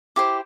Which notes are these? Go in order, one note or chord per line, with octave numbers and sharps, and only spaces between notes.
E4 G4 C5 D6